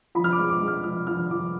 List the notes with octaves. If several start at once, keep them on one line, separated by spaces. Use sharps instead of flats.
F3 B5
F6
D6
G#3
D6
G#3
F6
F3 F6
F3 F6
F3 D6